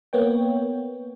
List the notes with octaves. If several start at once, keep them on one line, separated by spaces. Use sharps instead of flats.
A#3 B3 C#5 G5